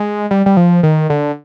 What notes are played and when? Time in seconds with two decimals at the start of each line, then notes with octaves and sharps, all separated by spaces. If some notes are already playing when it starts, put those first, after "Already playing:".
Already playing: G#3
0.31 G3
0.46 G3
0.57 F3
0.83 D#3
1.10 D3